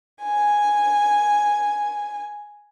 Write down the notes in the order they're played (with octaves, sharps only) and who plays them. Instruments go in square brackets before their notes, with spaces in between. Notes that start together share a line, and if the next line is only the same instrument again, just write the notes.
[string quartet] G#5